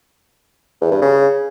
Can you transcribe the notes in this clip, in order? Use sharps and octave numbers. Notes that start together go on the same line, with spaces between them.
E2
G2
C#3